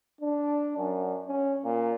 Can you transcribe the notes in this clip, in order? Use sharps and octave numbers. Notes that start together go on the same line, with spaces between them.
D4
F#2
C#4
A#2